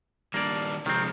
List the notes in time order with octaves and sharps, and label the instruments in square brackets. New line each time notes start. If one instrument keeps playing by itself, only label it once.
[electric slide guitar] D#3 G3 D4 [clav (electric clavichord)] A#3 D5
[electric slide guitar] C3 F3 G#3 [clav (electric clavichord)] D#3 C4